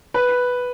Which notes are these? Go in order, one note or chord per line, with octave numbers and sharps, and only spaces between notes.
B4